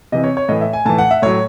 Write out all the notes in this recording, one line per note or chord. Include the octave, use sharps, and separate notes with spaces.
C3 E3 D#5
C#5
C#5
A2 E3 D#5
E5
G#5
A2 E3 A5
F#5
E5
A2 F#3 C#5